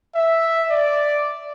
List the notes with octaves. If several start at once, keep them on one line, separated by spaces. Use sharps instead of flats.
E5
D5